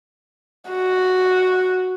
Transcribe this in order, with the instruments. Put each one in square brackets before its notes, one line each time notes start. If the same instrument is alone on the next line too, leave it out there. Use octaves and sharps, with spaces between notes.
[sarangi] F#4